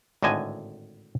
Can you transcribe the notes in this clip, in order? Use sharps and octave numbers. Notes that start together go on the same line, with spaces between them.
G#1 A2 D3 D#5 G#5